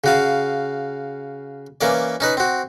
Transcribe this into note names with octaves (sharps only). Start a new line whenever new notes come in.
C#3 F#4 F5
E3 A#3 C#4 D5
C#4 D#4 B4
C4 F#4